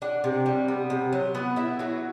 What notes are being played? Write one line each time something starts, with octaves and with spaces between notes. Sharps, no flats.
D4 F#5
C3
G3
B3
C3
F#3
B3 F#5
E4 E5
F#3 F#4